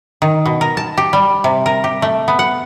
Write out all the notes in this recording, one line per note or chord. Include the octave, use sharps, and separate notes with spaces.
D#3
B2
A#4
A5
G4
G3
C3
A#4
G4
A3
B3
F#5